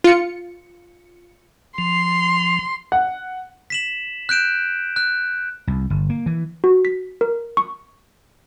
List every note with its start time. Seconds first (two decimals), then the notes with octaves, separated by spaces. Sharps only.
0.04 F4 C#7
1.78 F3 C6
2.92 F#5
3.70 B6 E7 F#7
4.29 F#6 G6 D7 E7
4.96 F#6
5.67 C2
5.90 G1
6.10 A#3
6.26 E3
6.64 F#4
6.85 B6
7.21 A#4
7.57 C#6